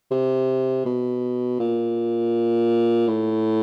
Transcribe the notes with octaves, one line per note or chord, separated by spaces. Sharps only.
C3
B2
A#2
A2